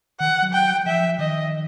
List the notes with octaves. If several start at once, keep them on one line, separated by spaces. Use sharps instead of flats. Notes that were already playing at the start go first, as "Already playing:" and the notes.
D#3 F#5
F#3
G5
F3 E5
D#3 D#5